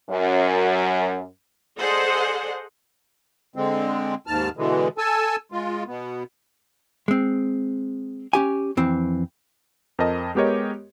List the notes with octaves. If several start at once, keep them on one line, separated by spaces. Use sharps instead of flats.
F#2
G#4 A4 C5 D5 D#5 F#5
D3 G#3 C4
D#2 G#2 A5 F6
B2 D3 E3 G#3
A4 G#5 A5 E6
G#3 F4
B2 B3
G#3 C4
C#4 G4 G#5
F2 E3 C4
F2 A#4 C5 D#5 A5
G#3 B3 G4 A#4 C#5 D#5